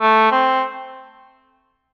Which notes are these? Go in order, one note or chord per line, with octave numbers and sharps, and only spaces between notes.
A3
C4